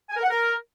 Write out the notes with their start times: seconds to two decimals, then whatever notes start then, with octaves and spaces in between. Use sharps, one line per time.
0.10 G#5
0.17 A#4
0.23 F#5
0.30 A#4